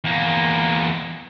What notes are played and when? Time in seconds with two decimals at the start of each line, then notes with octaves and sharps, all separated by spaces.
0.04 E2 A#3